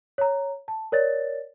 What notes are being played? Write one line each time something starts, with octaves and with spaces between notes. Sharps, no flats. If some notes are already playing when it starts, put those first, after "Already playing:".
C#5 A#5
A5
A#4 C#5 D5 A6